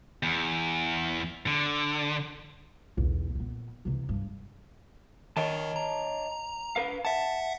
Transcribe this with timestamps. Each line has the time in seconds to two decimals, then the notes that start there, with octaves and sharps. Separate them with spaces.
0.23 E2
1.47 D3
2.97 B1 E2
3.35 A#2 B3
3.85 C3 E3
4.09 G2
5.37 D#3 C#5 D#5 A5
5.76 A#5
6.76 B4 F5
7.05 E5 F#5 A5